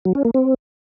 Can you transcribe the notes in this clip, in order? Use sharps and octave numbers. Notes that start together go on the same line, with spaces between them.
F#3
C#4
A#3
C4